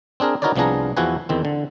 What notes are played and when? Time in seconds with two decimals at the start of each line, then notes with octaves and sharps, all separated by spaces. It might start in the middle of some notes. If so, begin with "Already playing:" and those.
0.20 C4 D4 G#4 A#4
0.42 D#4 F#4 A#4 B4 C#5 D5
0.56 C2 F3 B3 D4 G#4 A#5
0.97 E2 F3 E4 F#4 B4 G#5
1.29 E2 D#3 C4
1.45 D3